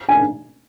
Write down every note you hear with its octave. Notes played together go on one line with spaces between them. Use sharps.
G#5